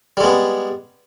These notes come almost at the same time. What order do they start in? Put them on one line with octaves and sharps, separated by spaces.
G3 G#3 B3